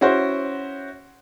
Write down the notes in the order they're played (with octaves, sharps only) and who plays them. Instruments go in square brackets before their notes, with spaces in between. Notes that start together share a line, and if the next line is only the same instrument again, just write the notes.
[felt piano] C#4 E4 F#4 C5